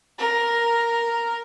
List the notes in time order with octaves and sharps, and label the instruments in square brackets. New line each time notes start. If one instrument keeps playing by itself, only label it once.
[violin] A#4